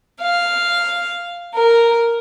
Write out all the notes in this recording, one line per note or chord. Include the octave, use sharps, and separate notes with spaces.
F5
A#4